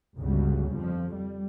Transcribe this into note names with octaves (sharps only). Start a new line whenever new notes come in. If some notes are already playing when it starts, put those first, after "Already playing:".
G1 C#2 C#3 F#3 G3
F2 F3
G3